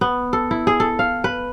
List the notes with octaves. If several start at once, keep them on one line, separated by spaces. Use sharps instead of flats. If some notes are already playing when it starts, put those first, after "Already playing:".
B3
A4
E4
G#4
A4
F5
B4